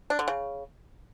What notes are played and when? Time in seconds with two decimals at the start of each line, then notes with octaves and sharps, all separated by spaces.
0.10 D4
0.19 D3
0.28 C#3